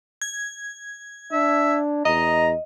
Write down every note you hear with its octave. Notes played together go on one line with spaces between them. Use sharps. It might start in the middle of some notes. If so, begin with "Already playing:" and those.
G#6
D4 E5
E2 D#5 A#5